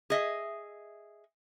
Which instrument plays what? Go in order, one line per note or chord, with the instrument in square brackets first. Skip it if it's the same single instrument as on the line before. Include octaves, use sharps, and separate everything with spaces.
[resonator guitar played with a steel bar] G#4 D#5 E5